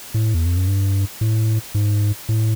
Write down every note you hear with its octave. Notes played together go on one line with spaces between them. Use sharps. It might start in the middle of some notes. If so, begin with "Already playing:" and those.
A2
E2
F2
F#2
G2
A2
G#2
A2